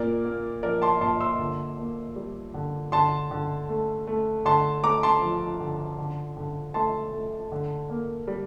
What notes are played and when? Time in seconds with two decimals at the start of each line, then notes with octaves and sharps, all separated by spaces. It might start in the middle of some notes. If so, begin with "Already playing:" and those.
Already playing: A#2 A#4 D5
0.25 A#3
0.63 F3 A#4 D5
0.82 A5 C6
1.01 A#2 A5 C6
1.20 C6 E6
1.39 D3
1.78 A#3
2.16 G3
2.54 D3
2.92 D3 A5 C6
3.31 D3
3.69 A3
4.07 A3
4.45 D3 A5 C6
4.83 A3 A#5 D6
5.03 A5 C6
5.21 F3
5.61 D3
5.98 D3
6.37 D3
6.74 A3 A5 C6
7.13 A3
7.52 D3
7.90 A#3
8.27 G3